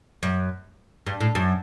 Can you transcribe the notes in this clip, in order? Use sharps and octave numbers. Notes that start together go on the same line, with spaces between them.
F#2
G2
A2
F#2